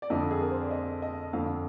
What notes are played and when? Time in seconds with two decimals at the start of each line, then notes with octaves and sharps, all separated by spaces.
0.02 D5
0.10 F2 D3 D#5
0.31 G#4
0.42 A#4
0.51 C5
0.61 D5
0.71 D#5
1.02 D#5
1.33 F2 D3 F5